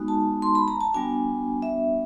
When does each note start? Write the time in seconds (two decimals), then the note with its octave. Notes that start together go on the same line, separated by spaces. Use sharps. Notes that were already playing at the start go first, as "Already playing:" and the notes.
Already playing: G#3 B3 D#4 F#4
0.08 A5
0.42 C6
0.55 B5
0.68 A#5
0.81 A5
0.94 G3 B3 D4 F#4 G#5
1.62 E5